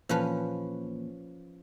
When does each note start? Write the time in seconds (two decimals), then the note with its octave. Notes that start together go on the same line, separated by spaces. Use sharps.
0.09 A#2 E3 F3 A#3 C#4 B4